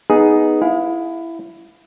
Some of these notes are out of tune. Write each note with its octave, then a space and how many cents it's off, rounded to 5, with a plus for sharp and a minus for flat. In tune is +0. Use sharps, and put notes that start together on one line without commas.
B3 +0 D#4 +5 G#4 +0
E4 +10 F5 +40